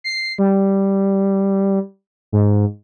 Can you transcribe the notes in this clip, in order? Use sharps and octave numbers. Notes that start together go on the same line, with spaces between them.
C7
G3
G#2